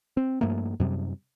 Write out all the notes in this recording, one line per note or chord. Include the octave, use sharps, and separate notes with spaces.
C4
G2 F3 A3 A#3
F#2 C3 G3